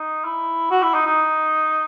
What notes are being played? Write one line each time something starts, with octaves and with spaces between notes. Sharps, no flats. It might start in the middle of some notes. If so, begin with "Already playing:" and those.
Already playing: D#4
E4
F#4
E4
D#4
D#4